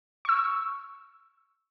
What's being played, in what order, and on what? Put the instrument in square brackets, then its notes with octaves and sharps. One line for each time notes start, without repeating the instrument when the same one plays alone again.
[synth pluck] C#6 E6